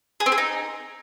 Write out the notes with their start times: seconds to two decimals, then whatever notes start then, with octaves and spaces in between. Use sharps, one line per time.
0.20 G#4
0.26 C4
0.32 G#4
0.38 D#4